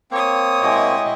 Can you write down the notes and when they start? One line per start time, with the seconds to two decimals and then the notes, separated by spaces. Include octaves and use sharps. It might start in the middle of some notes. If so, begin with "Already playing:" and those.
0.11 A#3 C4 C#5 D#6
0.62 G#3 E4 F#4 G4 D#5